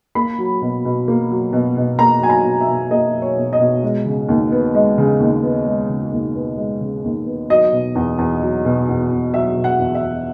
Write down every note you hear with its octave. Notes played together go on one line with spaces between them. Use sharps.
A#3 B5
F#3
B2
B2
A#3
F#3
B2
B2
A#3 A#5
F#3 G#5
A#5
B2
E5
B2
A#3 D#5
F#3
C#5
B2
D#5
B2
G#3
C#3
D#2
B3
G#3
C#3
D#2
B3
G#3
C#3
D#2
B3
G#3
C#3
D#2
B3
F#3 D#5
B2
E2
E2
F#3
B2
E2
E2
F#3 E5
B2
F#5
E2
E5
E2